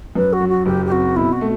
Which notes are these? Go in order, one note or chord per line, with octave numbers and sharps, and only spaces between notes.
F#2 B4
F#4
F#3
F#4
F#1 G4
G4
C4 F#4
B2 E4
F#4
A3